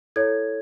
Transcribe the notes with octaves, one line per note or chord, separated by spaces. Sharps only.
E4 A4 C#5 G#6